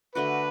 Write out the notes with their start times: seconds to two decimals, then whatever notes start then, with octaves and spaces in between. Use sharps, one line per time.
0.15 D3 A3 D4 F#4 B4